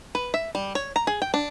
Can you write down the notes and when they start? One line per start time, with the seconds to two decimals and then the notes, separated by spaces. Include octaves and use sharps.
0.15 B4
0.34 E5
0.55 G3
0.75 C#5
0.96 A#5
1.07 G#4
1.22 G5
1.34 D4